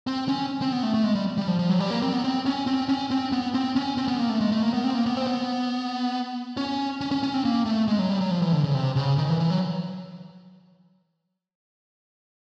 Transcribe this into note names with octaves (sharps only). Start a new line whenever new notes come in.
C4
C#4
C4
B3
A3
A3
G#3
G3
G3
F3
F3
F#3
G3
A#3
C4
B3
C4
C#4
C4
C#4
C4
B3
C4
C#4
C4
B3
A#3
A3
G#3
A3
A#3
B3
C4
A#3
B3
C4
B3
C#4
C#4
C#4
C#4
C4
A#3
A3
G#3
F#3
G3
F#3
F3
E3
D3
C#3
C3
C#3
D#3
E3
E3
F#3